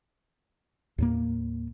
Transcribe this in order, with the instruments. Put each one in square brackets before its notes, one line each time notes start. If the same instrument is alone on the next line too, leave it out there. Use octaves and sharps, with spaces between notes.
[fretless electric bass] D#2 A2 A#3